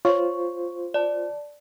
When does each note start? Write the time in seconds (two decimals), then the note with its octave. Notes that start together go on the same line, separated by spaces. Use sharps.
0.05 F4 C5 C#5 C#6
0.94 D5 A5